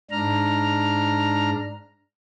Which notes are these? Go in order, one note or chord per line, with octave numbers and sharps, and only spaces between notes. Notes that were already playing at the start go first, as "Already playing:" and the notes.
G#2 D4 A#5 F6